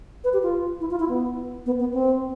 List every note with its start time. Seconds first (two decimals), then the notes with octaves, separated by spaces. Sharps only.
0.24 B4
0.33 G4
0.43 F4
0.81 E4
0.91 F4
1.00 E4
1.09 B3
1.66 B3
1.80 B3
1.93 C4